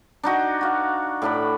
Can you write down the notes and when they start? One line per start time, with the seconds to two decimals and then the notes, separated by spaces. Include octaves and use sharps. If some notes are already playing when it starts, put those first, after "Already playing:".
0.23 D4 D#4 F#4
0.61 F#4 F5
1.22 A2 D4 B5